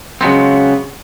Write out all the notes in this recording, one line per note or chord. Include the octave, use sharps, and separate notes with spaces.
C#3 F#3 G#3 B3 C4